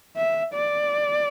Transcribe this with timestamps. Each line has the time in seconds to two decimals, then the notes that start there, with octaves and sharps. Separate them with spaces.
0.17 E5
0.54 D5